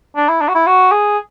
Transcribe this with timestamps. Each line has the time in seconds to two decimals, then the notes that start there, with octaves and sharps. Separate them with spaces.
0.16 D4
0.29 E4
0.41 D4
0.49 F#4
0.55 E4
0.67 F#4
0.92 G#4